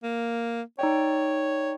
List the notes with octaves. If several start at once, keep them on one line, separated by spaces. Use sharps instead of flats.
A#3
D#4 C#5 D5 G5